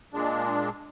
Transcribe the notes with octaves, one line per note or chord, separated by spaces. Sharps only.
A#2 G#3 D4